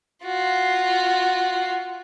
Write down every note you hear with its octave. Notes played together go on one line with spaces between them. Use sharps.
F4 F#4